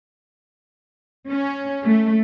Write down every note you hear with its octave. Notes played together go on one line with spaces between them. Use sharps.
C#4
A3